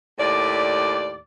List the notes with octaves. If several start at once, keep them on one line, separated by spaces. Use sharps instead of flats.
D#2 A2 D5